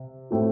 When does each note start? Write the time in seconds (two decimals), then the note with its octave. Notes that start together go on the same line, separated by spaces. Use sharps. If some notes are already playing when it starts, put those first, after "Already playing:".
Already playing: C3
0.31 A2 A3 C4 F#4